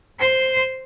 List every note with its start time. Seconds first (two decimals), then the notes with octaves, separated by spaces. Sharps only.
0.20 C5